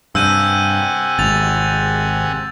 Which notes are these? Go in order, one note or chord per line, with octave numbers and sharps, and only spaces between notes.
G2 C3 F#5 G#5 E6 G6 D#7
G#1 A6 F7